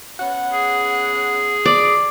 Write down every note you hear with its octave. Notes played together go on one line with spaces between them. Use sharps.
B3 C#4 F#5
G#4
D5